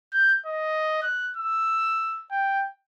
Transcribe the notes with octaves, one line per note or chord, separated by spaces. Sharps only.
G6
D#5
F#6
E6
G5